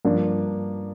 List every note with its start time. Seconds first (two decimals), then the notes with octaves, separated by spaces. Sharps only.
0.05 G2 F3 A#3 D4